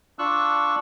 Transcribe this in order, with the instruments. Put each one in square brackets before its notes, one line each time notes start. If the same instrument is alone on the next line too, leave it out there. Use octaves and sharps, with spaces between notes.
[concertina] D4 F4 C#6 E6 F#6